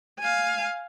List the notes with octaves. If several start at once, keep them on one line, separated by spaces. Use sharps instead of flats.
F5 G#5